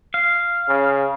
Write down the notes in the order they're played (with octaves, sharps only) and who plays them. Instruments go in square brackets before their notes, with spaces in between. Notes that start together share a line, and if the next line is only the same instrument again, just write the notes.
[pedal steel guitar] F5
[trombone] C#3